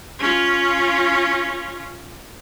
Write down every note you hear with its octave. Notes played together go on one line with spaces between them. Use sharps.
C#4 F4